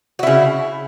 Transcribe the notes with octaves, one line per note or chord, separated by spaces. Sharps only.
C#3 E4 F#4